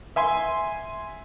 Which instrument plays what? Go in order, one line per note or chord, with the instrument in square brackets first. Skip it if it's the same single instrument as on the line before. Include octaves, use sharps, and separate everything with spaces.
[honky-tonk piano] E5 G#5 C6